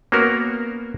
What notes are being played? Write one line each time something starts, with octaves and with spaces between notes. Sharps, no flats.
A#3 B3 C#4 F#4 A#4